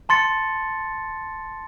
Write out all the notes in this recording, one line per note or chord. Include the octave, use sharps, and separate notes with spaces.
A5 C6 A6 C#7